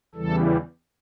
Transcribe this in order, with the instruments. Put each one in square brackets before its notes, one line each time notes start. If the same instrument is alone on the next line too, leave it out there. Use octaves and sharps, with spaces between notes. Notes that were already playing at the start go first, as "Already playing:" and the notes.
[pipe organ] E2 C#3 E3 G3 A4